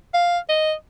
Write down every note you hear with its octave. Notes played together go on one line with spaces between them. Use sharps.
F5
D#5